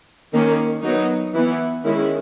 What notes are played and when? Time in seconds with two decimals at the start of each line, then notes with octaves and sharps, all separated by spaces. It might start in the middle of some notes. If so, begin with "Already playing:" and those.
0.33 D#3 A#3 C#4
0.83 F#3 B3 D#4
1.34 E3 B3 E4
1.84 D#3 G#3 C#4 E4